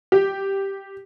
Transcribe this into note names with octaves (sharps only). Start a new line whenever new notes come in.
G4